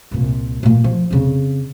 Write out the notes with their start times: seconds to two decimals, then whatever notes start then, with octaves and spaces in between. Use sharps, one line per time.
0.11 C2 A#2
0.63 A#2 A#3
0.84 F3
1.11 F2 C#3